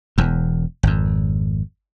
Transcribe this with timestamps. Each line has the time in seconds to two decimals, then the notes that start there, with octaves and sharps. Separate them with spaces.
0.18 E1 E2
0.83 G#1 F2